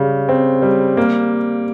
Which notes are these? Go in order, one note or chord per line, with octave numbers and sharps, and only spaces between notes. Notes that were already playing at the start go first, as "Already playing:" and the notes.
Already playing: C#3 G3
C4
G3
A#3